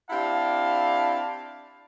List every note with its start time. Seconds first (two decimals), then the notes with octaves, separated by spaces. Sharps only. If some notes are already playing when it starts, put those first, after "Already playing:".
0.10 C4 D4 E4 G4 F5 A5